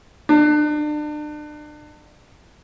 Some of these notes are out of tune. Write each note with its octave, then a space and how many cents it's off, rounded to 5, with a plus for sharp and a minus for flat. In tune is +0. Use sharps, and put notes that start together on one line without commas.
D4 +35